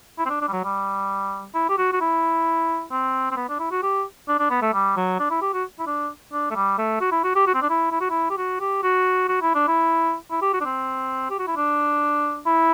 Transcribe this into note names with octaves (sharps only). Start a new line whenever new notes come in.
E4
C4
D4
D4
G3
F#3
G3
E4
G4
F#4
F#4
E4
C4
C4
B3
D4
E4
F#4
G4
D4
D4
B3
A3
G3
F#3
D4
E4
G4
F#4
E4
D4
D4
A3
G3
A3
F#4
E4
F#4
G4
F#4
C4
D4
E4
E4
F#4
E4
G4
F#4
G4
F#4
F#4
E4
D4
E4
E4
G4
F#4
D4
C4
G4
F#4
E4
D4
E4